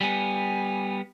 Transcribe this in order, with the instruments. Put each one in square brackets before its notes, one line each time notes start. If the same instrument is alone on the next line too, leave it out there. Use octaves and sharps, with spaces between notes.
[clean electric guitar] G3 B3 [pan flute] G#5